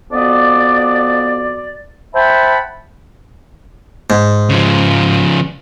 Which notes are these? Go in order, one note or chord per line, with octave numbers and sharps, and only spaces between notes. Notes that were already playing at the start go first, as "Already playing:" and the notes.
F2 B3 F#4 D5
C5 E5 F#5 G5 A5 B5
G#2
C#3 F3